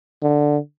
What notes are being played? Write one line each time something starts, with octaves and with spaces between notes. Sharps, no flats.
D3